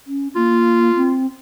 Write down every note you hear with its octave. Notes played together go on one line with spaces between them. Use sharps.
C#4
A#3 F4
C4